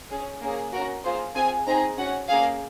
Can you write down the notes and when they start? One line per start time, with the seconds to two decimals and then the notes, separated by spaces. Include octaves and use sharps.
0.10 C#4 G#4
0.42 A#3 C#4 G#4
0.72 C#4 F#4 A#4
1.04 A#3 F4 G#4 C5
1.35 C4 F4 G#4 G#5
1.66 C4 D#4 G#4 A#5
1.98 C#4 F#4 F#5
2.29 A#3 C#4 G#4 F5